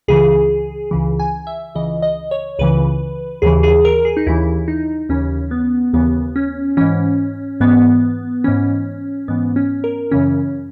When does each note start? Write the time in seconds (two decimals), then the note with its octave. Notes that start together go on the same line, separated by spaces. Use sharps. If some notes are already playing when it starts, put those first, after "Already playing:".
0.08 C#2 C#3 E3 G#4
0.91 C#2 C#3 E3
1.19 G#5
1.47 E5
1.75 C#2 C#3 E3 D#5
2.02 D#5
2.31 C#5
2.59 C#2 C#3 E3 B4
3.42 D#2 C#3 E3 G#4
3.63 G#4
3.85 A#4
4.05 G#4
4.17 D#4
4.27 D#2 C#3 E3 E4
4.68 D#4
5.09 D#2 C#3 E3 C#4
5.51 B3
5.93 D#2 C#3 E3 B3
6.36 C#4
6.77 G#2 E3 C#4
7.60 G#2 E3 B3
8.44 G#2 E3 C#4
9.28 G#2 E3 B3
9.56 C#4
9.84 A#4
10.11 F#2 C#3 E3 C#4